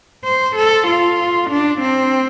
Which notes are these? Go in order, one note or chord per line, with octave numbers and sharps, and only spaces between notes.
C5
A4
F4
D4
C4